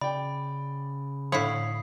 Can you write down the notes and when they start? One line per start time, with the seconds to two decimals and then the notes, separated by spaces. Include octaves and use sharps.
0.01 C#3 D5 G5 B5
1.32 A2 D3 C#5 F5 B5 D#6 B6 C7